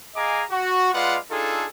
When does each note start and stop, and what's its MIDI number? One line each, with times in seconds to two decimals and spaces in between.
0.16 0.43 68
0.16 0.43 75
0.16 0.43 77
0.16 0.43 80
0.16 0.43 82
0.16 0.43 86
0.50 0.89 66
0.93 1.17 56
0.93 1.17 65
0.93 1.17 71
0.93 1.17 74
0.93 1.17 77
0.93 1.17 78
1.31 1.66 62
1.31 1.66 63
1.31 1.66 65
1.31 1.66 68
1.31 1.66 69